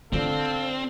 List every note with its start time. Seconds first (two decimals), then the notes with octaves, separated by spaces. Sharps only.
0.13 D3 C4 F4 A4 F5